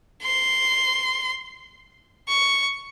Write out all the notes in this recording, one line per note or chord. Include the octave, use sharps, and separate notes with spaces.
C6
C#6